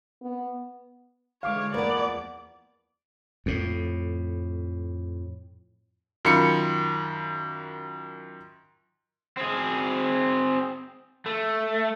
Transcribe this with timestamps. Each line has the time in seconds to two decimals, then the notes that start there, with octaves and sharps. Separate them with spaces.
0.22 B3
1.43 D3 E3 G#3 C#5 F5 D6
1.74 E2 F3 A#3 B3 B4 D5
3.46 F2 A2
6.25 F#2 D#3 F4 B5 C#7
9.37 C4 G#4
11.26 A3